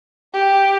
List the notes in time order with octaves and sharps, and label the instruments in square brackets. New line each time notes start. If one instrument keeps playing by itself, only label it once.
[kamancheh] G4